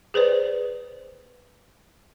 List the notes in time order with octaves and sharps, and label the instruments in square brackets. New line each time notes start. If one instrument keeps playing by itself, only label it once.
[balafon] G#4 B4 C5 D5